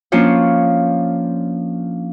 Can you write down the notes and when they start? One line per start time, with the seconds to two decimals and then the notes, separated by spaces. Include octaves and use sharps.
0.12 F3 A#3 C#4 D4 F4 C#5